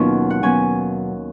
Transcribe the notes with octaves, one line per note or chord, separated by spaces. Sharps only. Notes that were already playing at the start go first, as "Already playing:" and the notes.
Already playing: D#2 B2 F#3 C#4 D#4 F4
F#5
B2 F#3 C#4 F4 G#5